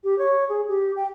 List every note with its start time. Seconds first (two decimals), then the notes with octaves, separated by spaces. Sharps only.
0.03 G4
0.18 C#5
0.49 G#4
0.68 G4
0.96 G5